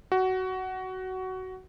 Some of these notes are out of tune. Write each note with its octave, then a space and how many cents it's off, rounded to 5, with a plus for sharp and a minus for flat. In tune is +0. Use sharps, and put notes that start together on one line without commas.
F#4 +15